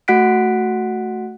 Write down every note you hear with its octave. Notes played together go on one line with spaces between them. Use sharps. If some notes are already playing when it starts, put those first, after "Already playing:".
A3 F#4 F#5 F#6 B6 D7